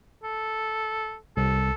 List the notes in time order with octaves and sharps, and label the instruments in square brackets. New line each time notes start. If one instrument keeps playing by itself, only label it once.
[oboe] A4
[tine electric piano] C2 [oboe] A4